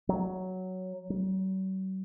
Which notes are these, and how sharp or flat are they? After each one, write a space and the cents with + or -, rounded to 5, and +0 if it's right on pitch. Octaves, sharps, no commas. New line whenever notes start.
F#3 +5
F#3 +45